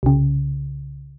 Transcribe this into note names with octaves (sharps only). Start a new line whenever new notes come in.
C2 C#3